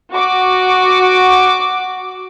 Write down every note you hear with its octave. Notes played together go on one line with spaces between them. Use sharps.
F#4 D6